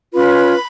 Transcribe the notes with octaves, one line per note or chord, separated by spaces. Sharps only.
C#4 F4 B4 B5